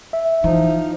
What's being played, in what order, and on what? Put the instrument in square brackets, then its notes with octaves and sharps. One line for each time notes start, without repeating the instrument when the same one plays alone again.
[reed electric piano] E5
[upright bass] E3 [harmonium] F3 D#4